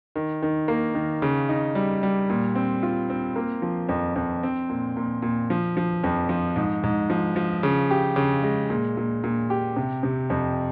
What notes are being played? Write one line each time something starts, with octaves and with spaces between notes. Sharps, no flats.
D#3
D#3
A#3
D#3
C#3
D#4
G3
G3
A#2
C4
F4
C4
A#3
F3
F2
F2
C4
A#2
A#2
A#2
F3
F3
F2
F3
G#2
G#2
F3
F3
C#3
G4
C#3
G#3
A#2
A#2
A#2
G4
C3
C3
F2